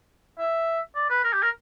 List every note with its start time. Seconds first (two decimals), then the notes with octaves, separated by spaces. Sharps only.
0.39 E5
0.95 D5
1.10 B4
1.24 A#4
1.33 G4
1.42 A#4